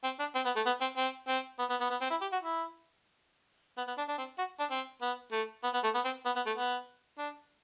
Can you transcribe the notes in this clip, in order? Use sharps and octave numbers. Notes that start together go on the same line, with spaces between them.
C4
D4
C4
B3
A3
B3
C4
C4
C4
B3
B3
B3
B3
C4
E4
G4
F#4
E4
B3
B3
D4
D4
C4
F#4
D4
C4
B3
A3
B3
B3
A3
B3
C4
B3
B3
A3
B3
D4